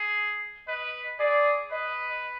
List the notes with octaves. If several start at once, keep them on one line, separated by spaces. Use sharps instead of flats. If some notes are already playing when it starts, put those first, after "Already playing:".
Already playing: G#4
B4 D#5
G#4 D5
B4 D#5